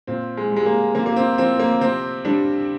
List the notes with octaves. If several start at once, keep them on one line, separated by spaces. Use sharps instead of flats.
A#2 C4
G#3
G3
G#3
A#3
C3 A#3
A#3
C4
F3 C4
A#3
C3 C4
G3 D4